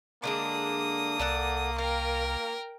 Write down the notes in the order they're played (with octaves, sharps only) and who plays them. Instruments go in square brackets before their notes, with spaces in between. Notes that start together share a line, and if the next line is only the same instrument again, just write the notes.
[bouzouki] D3 G#3 D4 [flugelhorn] A#3 [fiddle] D#6
[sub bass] C2 [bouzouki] A4 D5 F#5
[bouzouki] F4 [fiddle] A#4 G5